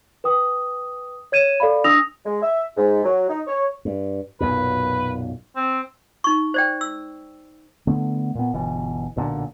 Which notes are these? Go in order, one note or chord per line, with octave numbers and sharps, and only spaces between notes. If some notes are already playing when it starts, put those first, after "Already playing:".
B4 G5 D#6
C#5 G#6 D#7 E7
A4 D5 F5 B5
D4 D#6 E6 A#6 F7
G#3
E5
G#2
F#3
D#4
C#5
G2
B1 F#2 A#2 B4
C4
D#4 C#6
C5 D5 G5
E6
D3 A3 B3
A#2 B3
G1 B2 E3
B1 A#2 D3